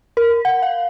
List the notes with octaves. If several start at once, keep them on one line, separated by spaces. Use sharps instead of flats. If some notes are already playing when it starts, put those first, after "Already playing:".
A#4
F#5
F5